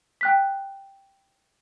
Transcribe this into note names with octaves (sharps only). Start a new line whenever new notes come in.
G5 F#6 B6